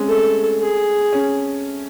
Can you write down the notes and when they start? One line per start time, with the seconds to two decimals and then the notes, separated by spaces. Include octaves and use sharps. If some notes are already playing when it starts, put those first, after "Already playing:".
Already playing: G#3 C4 C#4
0.08 A3 A4
0.61 G#4
1.12 C#4